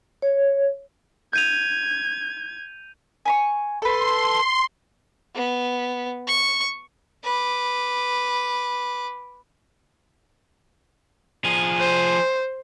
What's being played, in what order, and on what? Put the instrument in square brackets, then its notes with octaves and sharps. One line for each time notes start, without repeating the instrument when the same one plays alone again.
[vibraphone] C#5
[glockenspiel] G6 D#7 F7 [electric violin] G#6
[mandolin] G#5 B5 C#6
[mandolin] A4 B4 [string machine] C6
[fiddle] B3
C#6
B4 D6
[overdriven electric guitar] F3 G#4
[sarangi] C5